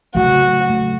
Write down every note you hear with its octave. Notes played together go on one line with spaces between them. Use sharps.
C#3 F#3 A3 F#4
C#3 F#3 A3